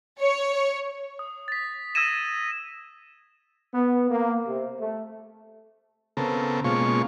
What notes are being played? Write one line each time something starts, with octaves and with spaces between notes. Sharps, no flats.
C#5
D#6
A6 B6
D#6 E6 G#6 A#6 D#7 E7
B3
A#3
C3
A3
C#3 B3 C4 A4 A#4
B2 G#3 A#3 C#4 F4 C#6